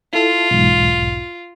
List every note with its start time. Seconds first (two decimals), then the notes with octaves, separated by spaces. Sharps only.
0.13 E4 F4 A4
0.51 B1 E2 G#2